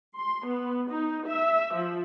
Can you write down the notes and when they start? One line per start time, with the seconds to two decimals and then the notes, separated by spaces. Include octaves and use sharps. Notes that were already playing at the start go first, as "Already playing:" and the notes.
0.15 C6
0.46 B3
0.89 D#4
1.27 E5
1.73 F3